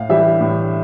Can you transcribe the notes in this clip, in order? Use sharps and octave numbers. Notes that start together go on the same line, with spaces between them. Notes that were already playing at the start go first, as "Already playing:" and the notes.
Already playing: A2 F5
E3 G3 E5
A2